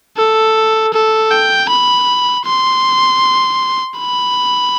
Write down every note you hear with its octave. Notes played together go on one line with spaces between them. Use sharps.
A4
A4
G5
B5
C6
B5